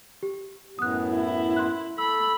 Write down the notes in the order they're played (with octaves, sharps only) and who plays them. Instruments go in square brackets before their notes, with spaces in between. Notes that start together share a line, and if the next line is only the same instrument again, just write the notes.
[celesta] G4
[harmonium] F#2 A2 B3 [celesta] D#6 F#6
[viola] E4
[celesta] C6 F#6
[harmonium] A4 [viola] B5 [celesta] E6